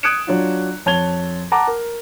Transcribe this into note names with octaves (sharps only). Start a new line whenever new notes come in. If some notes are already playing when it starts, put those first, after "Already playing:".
D#6 F#6 G#6 C#7 D7 E7
F#3 D4 F4
F2 C#5 A5 G#6 F7 G7
F#5 A5 A#5 D6
A#4